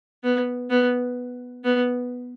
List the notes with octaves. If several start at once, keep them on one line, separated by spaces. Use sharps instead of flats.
B3
B3
B3